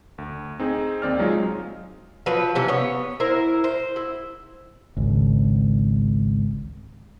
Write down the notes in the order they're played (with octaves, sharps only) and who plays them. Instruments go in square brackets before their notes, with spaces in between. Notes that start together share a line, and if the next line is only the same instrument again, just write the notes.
[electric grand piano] D2
C4 D#4 G#4
D#2 C4 D5 F6
F#3 G#3 D#4 F4 G#4
[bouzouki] F3 F#3 B4
C3 E3 C#4
B3 C#5
E4 A#4 C5
C5
E4
[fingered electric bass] G#1 C#2